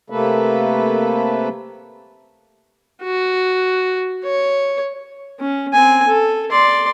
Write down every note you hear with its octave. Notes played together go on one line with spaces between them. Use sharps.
C3 A3 A#3 A4 B4
F#4
C#5
C#4
C4 G#5
A4
D5 C6